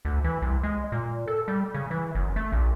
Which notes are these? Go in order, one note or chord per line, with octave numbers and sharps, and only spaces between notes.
D2
E3
C2
G#3
A#2
A4
G3
C#3
E3
F#1
A3
A#1